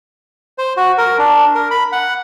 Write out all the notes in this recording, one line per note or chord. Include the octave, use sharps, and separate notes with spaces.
C5
F#4
A#4
D4
A#4
B5
F#5